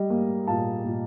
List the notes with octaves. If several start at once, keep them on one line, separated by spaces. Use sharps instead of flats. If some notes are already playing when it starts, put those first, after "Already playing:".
Already playing: G3 D#5
A#3
A#2 F5 A5
A#2